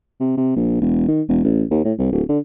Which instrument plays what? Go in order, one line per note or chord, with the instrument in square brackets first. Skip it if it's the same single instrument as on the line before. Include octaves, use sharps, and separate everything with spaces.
[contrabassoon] C3
C3
A#1
E1
D#3
E1
A1
D#2
A2
C2
D1
D3